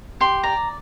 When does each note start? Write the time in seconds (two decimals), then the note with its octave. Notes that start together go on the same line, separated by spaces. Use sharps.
0.21 G4 C6
0.43 D5 A#5